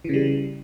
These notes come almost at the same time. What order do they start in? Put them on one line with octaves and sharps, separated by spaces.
E3 C#3 G3